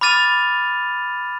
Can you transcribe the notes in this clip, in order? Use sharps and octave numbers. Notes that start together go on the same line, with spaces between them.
B5 D6 F6 A6 D#7 F7